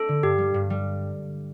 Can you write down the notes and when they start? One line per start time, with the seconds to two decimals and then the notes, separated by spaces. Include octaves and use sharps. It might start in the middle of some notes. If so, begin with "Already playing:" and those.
Already playing: A3 C4 D4 A4
0.08 D3
0.23 G2 G4
0.38 G3
0.54 G2
0.70 G3